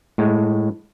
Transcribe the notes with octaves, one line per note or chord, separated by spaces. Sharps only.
A2 G#3